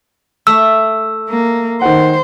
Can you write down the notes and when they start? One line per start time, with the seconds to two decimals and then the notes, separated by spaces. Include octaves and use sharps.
0.47 A3 E6
1.29 A#3
1.81 D#3 C5 F#5